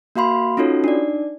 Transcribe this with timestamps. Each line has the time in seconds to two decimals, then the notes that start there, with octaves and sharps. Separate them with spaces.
0.15 A#3 F#4 F5 B5 C6
0.57 C#4 D#4 F4 F#4 A4 C#5
0.84 D4 D#4 D5